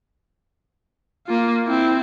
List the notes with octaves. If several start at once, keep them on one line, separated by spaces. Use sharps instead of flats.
A#3 F4
C4 E4